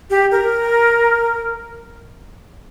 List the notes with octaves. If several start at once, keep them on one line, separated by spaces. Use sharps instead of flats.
G4
A#4